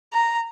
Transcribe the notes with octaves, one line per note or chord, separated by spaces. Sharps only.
A#5